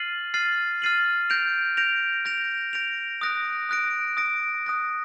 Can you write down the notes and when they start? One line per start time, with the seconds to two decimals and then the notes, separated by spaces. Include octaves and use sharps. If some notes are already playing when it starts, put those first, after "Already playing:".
Already playing: F6 A6 C7 D#7 F#7
0.34 F6 A6 C7 D#7 F#7
0.82 F6 A6 C7 D#7 F#7
1.30 G6 A#6 D7 F7
1.77 G6 A#6 D7 F7
2.25 G6 A#6 D7 F7
2.73 G6 A#6 D7 F7
3.21 D#6 F#6 A#6 D7
3.69 D#6 F#6 A#6 D7
4.17 D#6 F#6 A#6 D7
4.65 D#6 F#6 A#6 D7